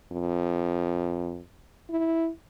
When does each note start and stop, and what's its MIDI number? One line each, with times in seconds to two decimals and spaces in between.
0.12 1.40 41
1.90 2.29 64